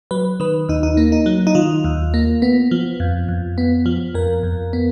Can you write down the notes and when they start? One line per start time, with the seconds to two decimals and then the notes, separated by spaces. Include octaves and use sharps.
0.11 F#3 B4
0.40 D#3 B4
0.69 D#2 D#4
0.83 D#4
0.97 A#3
1.12 D#4
1.26 F#3
1.47 D#4
1.55 D#3 F4
1.84 D#2
2.14 A#3
2.42 B3
2.71 F3
3.00 F2
3.29 F2
3.58 B3
3.86 F3
4.15 F2 A#4
4.43 F2
4.73 B3